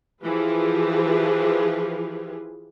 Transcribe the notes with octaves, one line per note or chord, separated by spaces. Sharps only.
E3 F3 F4 G4 G#4 B4